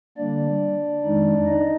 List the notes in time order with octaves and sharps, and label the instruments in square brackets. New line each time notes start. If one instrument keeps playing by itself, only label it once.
[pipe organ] D3 G3 A#3 D4 D5
F2 D#3 G#3 D#4
D#4 D#5